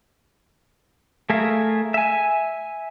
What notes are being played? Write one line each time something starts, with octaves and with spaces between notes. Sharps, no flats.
A3 G#4 A#4 E5 F5
E5 G#5